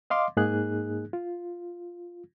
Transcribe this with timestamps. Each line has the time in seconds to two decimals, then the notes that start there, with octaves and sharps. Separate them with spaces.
0.10 D#5 F5 C6 D6
0.37 G#2 A#3 D#4 G#4 F#6
1.13 F4